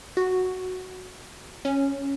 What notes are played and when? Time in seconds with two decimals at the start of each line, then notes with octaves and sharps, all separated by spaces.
0.17 F#4
1.65 C#4